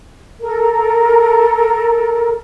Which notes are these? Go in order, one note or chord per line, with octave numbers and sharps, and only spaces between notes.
A4 A#4